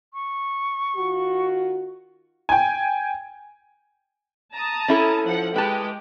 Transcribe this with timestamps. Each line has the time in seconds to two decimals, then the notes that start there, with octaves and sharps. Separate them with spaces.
0.14 C#6
0.96 D#3 F4 F#4
2.49 G5 G#5
4.54 A5 A#5 D#6
4.88 C#4 E4 A4
5.25 F3 F#5
5.56 G#3 G4 B4 A5